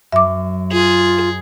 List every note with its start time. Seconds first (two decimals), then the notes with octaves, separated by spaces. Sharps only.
0.12 F#2 E5 D6
0.72 F4 G#4